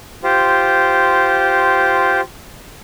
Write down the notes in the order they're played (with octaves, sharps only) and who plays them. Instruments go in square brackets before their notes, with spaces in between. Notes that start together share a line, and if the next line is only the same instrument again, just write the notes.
[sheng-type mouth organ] F4 G4 C5